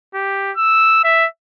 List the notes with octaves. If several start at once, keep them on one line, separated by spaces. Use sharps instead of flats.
G4
E6
E5